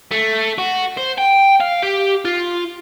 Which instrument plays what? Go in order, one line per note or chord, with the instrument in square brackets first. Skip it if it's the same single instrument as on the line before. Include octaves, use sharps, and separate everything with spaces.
[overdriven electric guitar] A3
F#4
C5
G5
F5
G4
F4